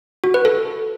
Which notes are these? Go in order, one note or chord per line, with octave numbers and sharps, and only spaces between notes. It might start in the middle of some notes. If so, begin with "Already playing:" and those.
F#4
B4
A4